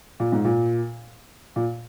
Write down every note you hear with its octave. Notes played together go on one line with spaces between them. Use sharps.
A#2
G#2
A#2
A#2